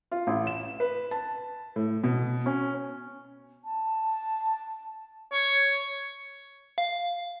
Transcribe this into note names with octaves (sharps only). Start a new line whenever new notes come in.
F4
A1
E7
B4
A5
A2
B2
C#4
A5
C#5
F5